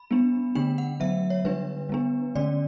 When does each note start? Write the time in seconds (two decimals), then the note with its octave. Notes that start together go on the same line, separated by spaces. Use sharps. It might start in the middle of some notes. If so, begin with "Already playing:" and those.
Already playing: B5
0.11 G3 B3 D4
0.55 D3 A3 D4 G5
0.78 F#5
1.00 D3 F#3 B3 E5
1.30 C#5
1.45 D3 G3 D4 B4
1.89 G3 B3 D4
2.35 D3 A3 C#4 D5